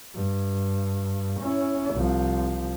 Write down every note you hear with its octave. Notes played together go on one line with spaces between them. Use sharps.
G2
C#4 E4
C2 F3